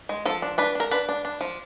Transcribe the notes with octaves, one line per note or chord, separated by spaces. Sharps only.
G#3
F3 A4
D4
D4 B4
D4 A#4
D4 B4
D4
D4
F3